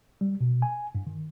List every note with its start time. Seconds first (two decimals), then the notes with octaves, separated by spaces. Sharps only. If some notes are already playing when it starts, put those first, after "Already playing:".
0.21 G3
0.41 B2
0.62 G#5
0.95 G2
1.07 D#3